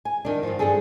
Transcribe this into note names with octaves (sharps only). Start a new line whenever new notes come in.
G#5
D#3 D4
G2 F3
G2 A#2 D4 G#4 A4